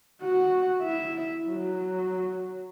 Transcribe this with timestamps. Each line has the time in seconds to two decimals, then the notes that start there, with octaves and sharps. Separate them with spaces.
0.22 F#4 F#5
0.82 E4 E5
1.48 F#3